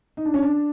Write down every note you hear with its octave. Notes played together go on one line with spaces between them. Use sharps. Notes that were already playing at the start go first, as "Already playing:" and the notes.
D#4
D4
C#4
D4